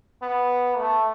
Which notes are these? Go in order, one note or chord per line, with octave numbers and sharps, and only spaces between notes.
B3
A3